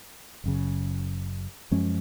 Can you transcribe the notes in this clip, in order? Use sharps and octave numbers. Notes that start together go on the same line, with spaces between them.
F#1 F#2 C#3
F#2 F3 G#3 C#4